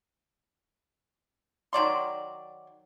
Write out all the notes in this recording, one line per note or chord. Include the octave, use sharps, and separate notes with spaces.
D#3 F#3 D5 C6